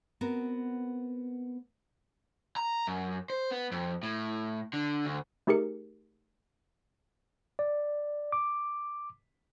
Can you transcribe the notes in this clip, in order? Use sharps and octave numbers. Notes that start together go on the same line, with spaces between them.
B3 C4 F#4 A#4
A#5
F#2
C5
B3
F2
A2
D3
D2
A3 D#4 G4 G#4 A#4 C#7
D5
D6